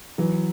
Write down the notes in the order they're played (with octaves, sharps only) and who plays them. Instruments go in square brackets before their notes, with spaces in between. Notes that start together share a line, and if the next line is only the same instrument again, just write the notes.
[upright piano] E3 F#3